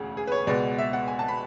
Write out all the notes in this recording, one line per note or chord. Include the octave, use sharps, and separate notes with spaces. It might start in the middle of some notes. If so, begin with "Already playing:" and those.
Already playing: E1 D2 C#3
G#4
B4
C#5
C#2 B2 G#3 B3 D5
E5
F#5
G#5
A5
B5